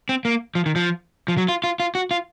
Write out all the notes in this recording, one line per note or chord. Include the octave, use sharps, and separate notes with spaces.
C4
A#3
F3
D#3
F3
F3
F#3
F4
F4
F4
F#4
F4